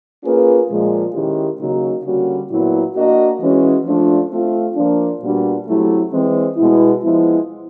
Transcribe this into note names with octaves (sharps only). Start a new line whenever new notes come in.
A#3 C#4 F4 G#4 B4
A#2 F3 G#3
D#3 G#3 C#4 E4 G4
C#3 F#3 A#3 D#4 F#4
D3 G3 A#3 C#4 F#4
A#2 F#3 B3 E4
A#3 D4 F#4 A#4 D#5
E3 G#3 C#4 F#4
F3 A3 D4 F4
A3 C4 F4
F3 A#3 D4
A#2 G3 B3 D4 F#4
F#3 A3 C4 E4 G4
E3 G#3 C4
B2 G#3 B3 E4
F3 G#3 B3 E4